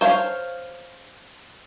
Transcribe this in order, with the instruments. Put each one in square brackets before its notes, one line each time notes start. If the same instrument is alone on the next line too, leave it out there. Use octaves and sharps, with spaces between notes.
[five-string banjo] C5 C#5 F5